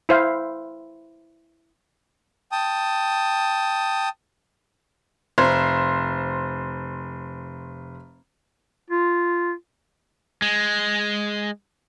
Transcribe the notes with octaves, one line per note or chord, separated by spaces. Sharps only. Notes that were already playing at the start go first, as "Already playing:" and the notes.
E4 C5 F5
G5 A5 D#6
F1 C5
F4
G#3